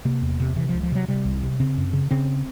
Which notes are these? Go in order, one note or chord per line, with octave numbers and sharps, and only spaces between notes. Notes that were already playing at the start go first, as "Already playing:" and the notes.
C3 A#3
E2
C3
C3 E3
C#2 F3
F3
C3 F#3
C3 G3
C2
C3
C#3 C4
F#2
C#3
C#3 C4